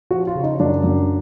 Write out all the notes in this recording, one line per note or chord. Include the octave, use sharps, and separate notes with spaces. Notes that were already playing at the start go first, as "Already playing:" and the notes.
F3 F#4
F4
C#3
D#4
F#2 D4
F#2